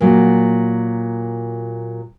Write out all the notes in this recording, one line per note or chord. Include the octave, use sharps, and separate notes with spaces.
A#2 F#3